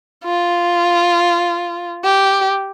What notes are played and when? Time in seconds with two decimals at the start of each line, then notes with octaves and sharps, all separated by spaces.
0.24 F4
2.04 G4